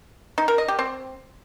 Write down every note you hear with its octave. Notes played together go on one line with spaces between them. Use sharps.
D#4
A#4
D#5
G4
C4